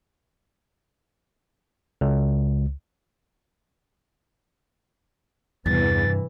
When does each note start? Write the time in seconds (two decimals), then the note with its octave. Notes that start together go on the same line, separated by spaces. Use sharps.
2.01 C#2
5.66 E2 G2 C3 E3 A6